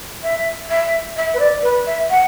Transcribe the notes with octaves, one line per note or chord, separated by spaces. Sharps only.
E5
E5
E5
B4
D5
B4
E5
F#5